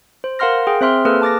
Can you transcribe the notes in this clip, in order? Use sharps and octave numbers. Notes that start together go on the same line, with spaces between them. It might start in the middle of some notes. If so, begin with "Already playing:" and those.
C5
A#4 F5 F#5 C6 F6 A#6
G#4 G5
C4 C5 E5 C6 F6
A#3 G#4 A4 B4 F6
A5 D6 A6 A#6